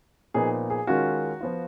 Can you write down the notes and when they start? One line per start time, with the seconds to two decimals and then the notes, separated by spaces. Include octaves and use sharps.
0.34 A#2 F3 B3 D#4 G#4
0.70 G#4
0.87 D#3 G#3 C#4 F4 F#4
1.41 F3 B3 F4